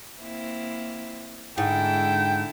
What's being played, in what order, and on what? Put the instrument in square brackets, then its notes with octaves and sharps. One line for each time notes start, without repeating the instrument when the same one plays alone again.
[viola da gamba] A#3 C4 E4
[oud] G#2 [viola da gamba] D3 E4 A4 [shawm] G5